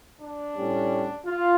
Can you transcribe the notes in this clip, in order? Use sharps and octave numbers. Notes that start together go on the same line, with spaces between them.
D4
A2 G3 C#4
F4